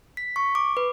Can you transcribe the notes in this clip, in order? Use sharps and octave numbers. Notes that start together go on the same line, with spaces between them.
B6
C#6
D6
B4